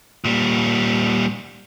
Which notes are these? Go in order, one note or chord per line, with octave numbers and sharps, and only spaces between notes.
A#2 G3